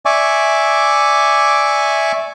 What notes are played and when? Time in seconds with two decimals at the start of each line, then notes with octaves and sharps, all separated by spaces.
0.06 D5 E5 G#5 C#6 D6